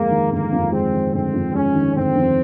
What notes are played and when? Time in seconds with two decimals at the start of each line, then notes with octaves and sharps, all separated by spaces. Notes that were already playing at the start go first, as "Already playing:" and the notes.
Already playing: G1 F2 G#3 A#3
0.11 D#3
0.31 G1 A#3
0.52 F2
0.72 G#3 C4
0.93 D#3
1.13 G1 C4
1.33 F2
1.54 G#3 C#4
1.75 D#3
1.96 G1 C4
2.15 F2